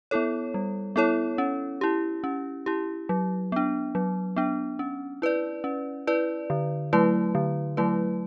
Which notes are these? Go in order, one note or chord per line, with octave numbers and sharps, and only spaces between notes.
B3 E4 A4 C#5
G3
B3 E4 A4 C#5
C#4
E4 G4
C#4
E4 G4
F#3
B3 D4
F#3
B3 D4
C#4
E4 B4 D5
C#4
E4 B4 D5
D3
F#3 A3 E4 B4
D3
F#3 A3 E4 B4